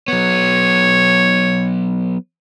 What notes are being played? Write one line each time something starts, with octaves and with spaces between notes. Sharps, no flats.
F#3 B3 C#5